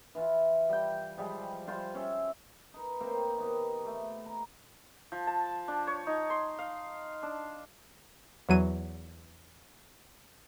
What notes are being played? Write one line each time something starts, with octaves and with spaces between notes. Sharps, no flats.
E3 F4
G3 G5
F3 G3 G#3
G3 F4 C5
C#4 E5
D#4 B4
A#3 C4 C5 G5
D#3 B3 G4
A3 C#6
A#5
F3
A5
D4
C#5
D#4
C6
F5
D4
E2 F#3 D#7